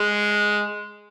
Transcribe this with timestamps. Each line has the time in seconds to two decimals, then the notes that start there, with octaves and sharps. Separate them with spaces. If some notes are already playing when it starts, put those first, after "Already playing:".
Already playing: G#3